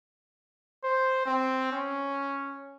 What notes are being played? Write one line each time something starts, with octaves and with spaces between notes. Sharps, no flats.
C5
C4
C#4